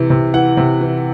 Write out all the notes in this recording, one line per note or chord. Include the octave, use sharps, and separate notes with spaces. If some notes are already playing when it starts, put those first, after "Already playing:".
Already playing: C3 E3
C3
E3 F#5
C3
E3